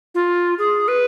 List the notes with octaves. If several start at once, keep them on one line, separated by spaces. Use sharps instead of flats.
F4
G#4
B4